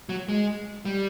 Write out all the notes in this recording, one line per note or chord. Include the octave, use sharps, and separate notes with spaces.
F#3
G#3
G3